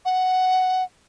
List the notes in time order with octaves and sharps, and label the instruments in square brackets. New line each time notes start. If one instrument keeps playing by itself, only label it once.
[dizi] F#5